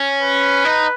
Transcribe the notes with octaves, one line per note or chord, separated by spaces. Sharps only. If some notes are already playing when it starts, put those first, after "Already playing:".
Already playing: C#4
B4
D#4